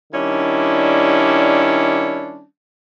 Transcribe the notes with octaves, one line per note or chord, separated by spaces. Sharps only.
D#3 G3 C#4 D4 E4